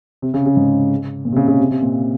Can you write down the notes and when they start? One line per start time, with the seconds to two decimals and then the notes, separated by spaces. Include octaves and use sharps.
0.22 C3
0.34 C#3
0.46 C#3
0.57 G#2
1.25 A#2
1.32 C3
1.36 C#3
1.47 C#3
1.59 C3
1.71 C3
1.82 A#2